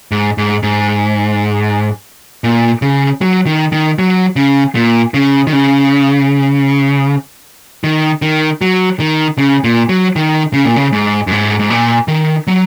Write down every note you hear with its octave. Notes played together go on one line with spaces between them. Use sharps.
G#2
G#2
G#2
A#2
C#3
F#3
D#3
D#3
F#3
C#3
A#2
C#3
D#3
C#3
D#3
D#3
F#3
D#3
C#3
A#2
F#3
D#3
C#3
A#2
C#3
G#2
F#2
G#2
G#2
A#2
D#3
F#3